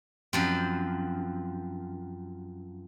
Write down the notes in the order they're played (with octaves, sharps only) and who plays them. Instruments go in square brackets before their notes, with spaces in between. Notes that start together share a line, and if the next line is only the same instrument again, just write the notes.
[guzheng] F#2 F3 C4